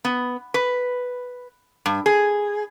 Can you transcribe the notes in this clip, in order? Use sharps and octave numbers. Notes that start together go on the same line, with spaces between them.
B3
B4
G2
G#4